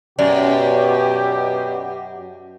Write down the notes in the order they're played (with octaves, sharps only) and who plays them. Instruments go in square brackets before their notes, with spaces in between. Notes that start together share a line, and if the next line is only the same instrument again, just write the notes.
[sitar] F#2 [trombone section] B2 [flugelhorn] G4 [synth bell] D5